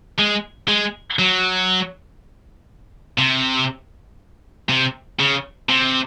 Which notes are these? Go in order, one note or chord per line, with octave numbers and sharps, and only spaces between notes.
G#3
G#3
F#3
C3
C3
C#3
C3